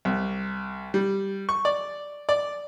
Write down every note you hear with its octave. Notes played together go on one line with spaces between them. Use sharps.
C2
G3
C#6
D5
D5